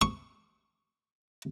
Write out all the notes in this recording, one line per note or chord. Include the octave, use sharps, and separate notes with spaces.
C#6